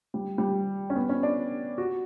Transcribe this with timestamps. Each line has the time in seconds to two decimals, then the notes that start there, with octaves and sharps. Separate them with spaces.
0.14 G3
0.38 G3
0.90 C#4
0.96 B3
1.09 C#4
1.23 D4
1.78 F#4